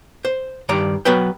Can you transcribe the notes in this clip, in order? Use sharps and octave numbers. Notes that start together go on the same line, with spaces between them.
C5
G2 D#3 D5 A#5
F#3 B3 B4 G5